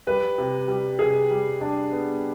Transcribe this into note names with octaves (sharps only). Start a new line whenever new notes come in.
G3 B4
C3
G3
C3 G#4
G3
D4
B3